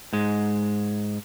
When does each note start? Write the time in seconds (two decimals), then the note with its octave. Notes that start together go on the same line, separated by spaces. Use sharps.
0.13 G#2 G#3